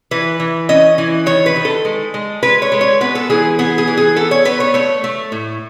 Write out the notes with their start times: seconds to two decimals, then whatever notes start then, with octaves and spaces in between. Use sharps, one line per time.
0.11 E3 B4
0.40 E3
0.69 C#4 D#5
0.98 E3
1.26 D#3 C#5
1.46 B4
1.56 D#3
1.65 A4
1.85 G#3
2.14 G#3
2.43 G#3 B4
2.62 C#5
2.72 G#3
2.81 C#5
3.01 B3 B4
3.15 A4
3.30 E3 G#4
3.59 B3 G#4
3.78 G#4
3.88 E3
3.97 G#4
4.16 B3 A4
4.31 C#5
4.45 B3 B4
4.60 C#5
4.74 A3 C#5
5.04 A3
5.32 A2